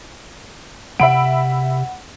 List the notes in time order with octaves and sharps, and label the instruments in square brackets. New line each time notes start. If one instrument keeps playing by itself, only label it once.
[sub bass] C3 [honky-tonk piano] E5 B5 D7 [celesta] F#5